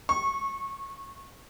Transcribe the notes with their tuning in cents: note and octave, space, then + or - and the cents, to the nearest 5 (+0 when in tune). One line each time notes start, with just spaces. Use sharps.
C#6 -20